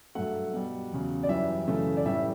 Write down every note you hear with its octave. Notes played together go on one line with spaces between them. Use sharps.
G2 F#3 A3 F#5
B2 G3
E2 C#3 F#3
D5
F#2 E3 G3 E5
F#2 C#3 E3 A3
D5
A2 E3 G3 E5